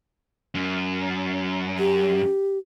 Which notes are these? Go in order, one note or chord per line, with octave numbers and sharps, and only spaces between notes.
F#2
G4